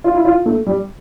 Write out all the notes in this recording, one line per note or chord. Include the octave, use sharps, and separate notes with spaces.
F4
E4
F4
A3
G3